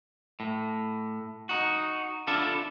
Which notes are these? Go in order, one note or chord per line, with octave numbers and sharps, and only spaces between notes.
A2
D#4 F#4
D4 E4 F4 A4